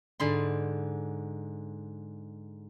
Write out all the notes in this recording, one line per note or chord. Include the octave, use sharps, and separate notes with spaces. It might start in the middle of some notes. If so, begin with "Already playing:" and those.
G#2 D3 B5 C6